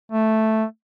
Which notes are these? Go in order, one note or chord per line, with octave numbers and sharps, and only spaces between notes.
A3